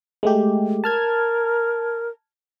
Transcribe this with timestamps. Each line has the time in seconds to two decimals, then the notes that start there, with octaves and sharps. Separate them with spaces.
0.23 G#3 A3 G4
0.84 A#4 A5 F6 G#6